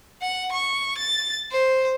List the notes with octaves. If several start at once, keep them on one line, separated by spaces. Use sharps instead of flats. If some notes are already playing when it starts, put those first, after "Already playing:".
F#5
C#6
A6
C5